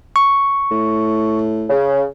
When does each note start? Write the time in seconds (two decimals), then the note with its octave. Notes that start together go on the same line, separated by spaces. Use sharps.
0.16 C#6
0.71 A2
1.70 C#3